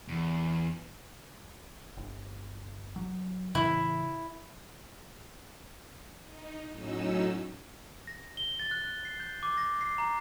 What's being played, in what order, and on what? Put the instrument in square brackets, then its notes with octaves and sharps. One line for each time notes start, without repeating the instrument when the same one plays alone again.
[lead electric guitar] E2
[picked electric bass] G1
F#3
[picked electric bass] A2 C#3 E3 [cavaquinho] E4
[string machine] D#4
A2 F#3 C#4 D#4 E6
[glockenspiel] A#6
G7
A6
F#6
C7
G6
D6
A#6
C7
A#5